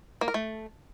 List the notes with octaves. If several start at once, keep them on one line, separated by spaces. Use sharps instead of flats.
A#3
A#4
A3